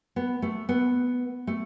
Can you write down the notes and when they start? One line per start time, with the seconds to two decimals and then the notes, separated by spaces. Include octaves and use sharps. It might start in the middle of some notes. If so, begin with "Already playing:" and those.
0.16 B3
0.42 A3
0.69 B3
1.47 A3